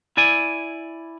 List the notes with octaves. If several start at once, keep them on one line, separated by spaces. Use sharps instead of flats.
E4 D5 G#5